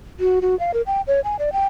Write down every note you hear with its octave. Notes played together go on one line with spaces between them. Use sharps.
F#4
F#4
F5
A#4
G5
C#5
G#5
D5
G5